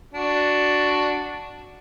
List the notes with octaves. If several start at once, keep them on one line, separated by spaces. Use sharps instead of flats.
D4 F#4